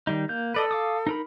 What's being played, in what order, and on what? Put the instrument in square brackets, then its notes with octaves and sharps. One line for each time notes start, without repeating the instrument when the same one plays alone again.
[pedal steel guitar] D#3 G3 D#4
A#3 G6
[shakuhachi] A4 [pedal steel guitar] B4 D5 D#5
[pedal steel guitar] F5 D6 D#6
D#4 A#4 B5